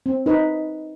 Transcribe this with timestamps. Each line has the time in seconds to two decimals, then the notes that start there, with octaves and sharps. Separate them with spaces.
0.06 C4
0.26 D#4 B4